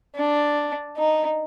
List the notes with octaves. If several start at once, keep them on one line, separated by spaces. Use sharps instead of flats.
D4
D#4